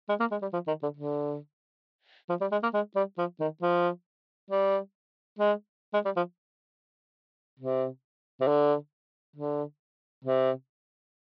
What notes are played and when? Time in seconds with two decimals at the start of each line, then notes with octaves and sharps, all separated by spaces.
0.09 G#3
0.20 A#3
0.31 G#3
0.42 G3
0.53 F3
0.67 D#3
0.83 D3
0.96 D3
2.29 F3
2.41 G3
2.51 G#3
2.62 A#3
2.73 G#3
2.96 G3
3.18 F3
3.40 D#3
3.62 F3
4.50 G3
5.38 G#3
5.93 G#3
6.05 G3
6.16 F3
7.59 C3
8.40 C3
8.47 D3
9.36 D3
10.24 C3